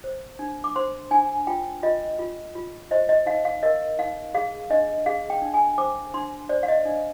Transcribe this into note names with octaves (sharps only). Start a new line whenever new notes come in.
C5
D4
D6
C5 C6
D4 G#5
F4 G5
F4 D#5
F4
F4
C5 D#5
D#5
D#4 F5
F5
A#4 D#5
D#4 F5
G#4 F5
D4 D#5
G#4 F5
G5
D4
G#5
C5 D6
D4 C6
C5 D5
F5
D#5
D4